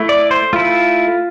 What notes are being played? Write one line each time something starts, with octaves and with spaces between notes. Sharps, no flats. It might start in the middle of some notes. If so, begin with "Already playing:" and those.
Already playing: A3 E4
D5
C5
A3 E4 F4